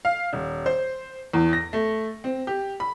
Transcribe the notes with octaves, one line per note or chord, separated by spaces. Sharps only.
F5
D#1
C5
E2
A#6
A3
C4
G4
B5